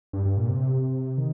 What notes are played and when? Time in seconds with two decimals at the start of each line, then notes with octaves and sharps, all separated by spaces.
0.13 G2
0.25 G2
0.37 A#2
0.49 C3
1.18 D#3